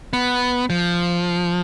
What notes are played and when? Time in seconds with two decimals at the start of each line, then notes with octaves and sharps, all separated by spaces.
0.13 B3
0.70 F3